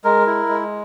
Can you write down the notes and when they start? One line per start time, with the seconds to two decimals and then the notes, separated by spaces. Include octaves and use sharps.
0.04 G#3 A#4
0.26 E4
0.49 G#3